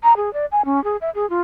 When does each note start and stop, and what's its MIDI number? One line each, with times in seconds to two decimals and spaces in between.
0.03 0.16 82
0.17 0.32 68
0.33 0.45 74
0.52 0.65 80
0.65 0.83 61
0.84 0.97 68
1.01 1.10 76
1.15 1.29 68
1.30 1.41 65